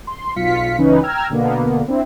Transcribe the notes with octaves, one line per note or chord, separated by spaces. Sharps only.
C6
B1 F4 F5 B6 C#7
C#2 E3 C#4 D#4 B4
G5 A#5 E6 F6 G#6
B2 D3 A#3 B3
C4 D4 E4